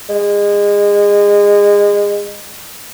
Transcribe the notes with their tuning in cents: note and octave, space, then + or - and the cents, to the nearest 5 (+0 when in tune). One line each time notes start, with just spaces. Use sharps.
G#3 -25